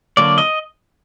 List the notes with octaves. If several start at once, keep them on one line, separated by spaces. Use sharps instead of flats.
D3 F#3 A#3 D5
D#5